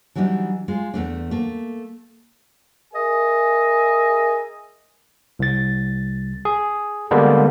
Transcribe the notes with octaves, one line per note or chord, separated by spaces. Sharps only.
E3 F#3 G3 D4 D#4
G#3 F4
E2 A3 D4
A3 A#3
G#4 A#4 D#5 E5 G#5
C2 A6
G#4
D3 G3 G#3 A#3 B3 D4